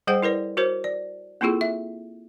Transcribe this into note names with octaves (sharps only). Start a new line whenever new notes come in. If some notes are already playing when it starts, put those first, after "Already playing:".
G3 G#4 C5 F#5 G5
E4 A#4 B4 D5
F#4 A#4 C5 C#5
D5
A#3 C4 E4 F4 G#4 A4
E5